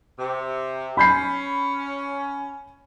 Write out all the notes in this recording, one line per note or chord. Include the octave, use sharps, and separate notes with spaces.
C3
C#4 B5 G6 C7